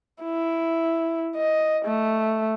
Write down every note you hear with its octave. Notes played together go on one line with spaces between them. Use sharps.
E4
D#5
A3